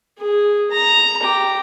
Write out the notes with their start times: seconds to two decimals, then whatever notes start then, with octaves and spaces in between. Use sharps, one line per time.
0.19 G#4
0.71 A#5
1.23 G4